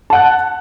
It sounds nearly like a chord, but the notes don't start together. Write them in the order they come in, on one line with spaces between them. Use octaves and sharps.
A5 F#5 F#6